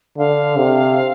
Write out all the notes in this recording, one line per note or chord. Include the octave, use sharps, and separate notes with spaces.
D3 F5
C3